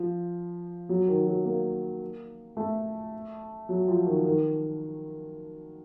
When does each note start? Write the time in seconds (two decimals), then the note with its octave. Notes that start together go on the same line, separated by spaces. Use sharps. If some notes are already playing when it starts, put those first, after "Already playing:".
Already playing: F3
0.89 F#3
1.08 D#3
1.27 F#3
1.45 A#3
2.57 A3
3.69 F#3
3.88 F3
4.06 D#3
4.25 D#3